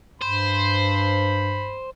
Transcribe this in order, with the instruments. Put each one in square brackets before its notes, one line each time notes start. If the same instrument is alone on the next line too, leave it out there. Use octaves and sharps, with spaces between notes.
[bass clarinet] G2 [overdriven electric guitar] C5 [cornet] B5